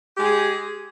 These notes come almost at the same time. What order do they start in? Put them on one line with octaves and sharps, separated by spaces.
G4 G#3 G#4